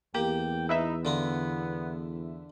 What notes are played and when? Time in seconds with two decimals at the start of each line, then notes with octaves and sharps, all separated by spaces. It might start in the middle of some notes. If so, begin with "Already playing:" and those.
0.15 E2 A#3 G4 G5
0.69 D#4 E4 B4 E5
1.05 D3 B3 F4 A#5